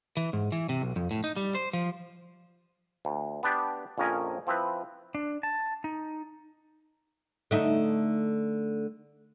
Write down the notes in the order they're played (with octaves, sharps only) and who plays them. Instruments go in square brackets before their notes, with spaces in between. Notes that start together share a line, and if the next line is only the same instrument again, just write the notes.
[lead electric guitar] E3
G#2
E3
C3
B1
F2
A2
D#4
G3
C5
F3
[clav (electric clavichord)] D2
B3 D4 G4
A#1 F2 C#4 A#4 D#5 G#5
F3 C4 E4 B4
[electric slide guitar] D4
A5
D#4
[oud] D3 A3 D#4